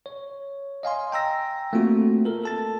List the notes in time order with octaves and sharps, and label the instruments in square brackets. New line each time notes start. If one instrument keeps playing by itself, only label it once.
[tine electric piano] C#5
D#5 F5 G#5 C6
G5 A#5 E6 A#6
A3 A#3 C4 F4 F#4
A4 A#4
A4 A5 A6